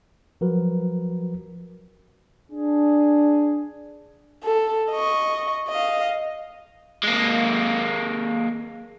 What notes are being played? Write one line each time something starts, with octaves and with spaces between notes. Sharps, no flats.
F3 F#3 F#4 A#4 B4
D4 G#4
A4
D#5 C#6
D#5 F5
G#3 A#3